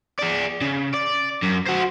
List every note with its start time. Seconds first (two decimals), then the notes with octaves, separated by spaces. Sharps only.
0.19 G#4 D5
0.62 C#3
0.94 D5
1.43 F#2
1.66 F#4 C5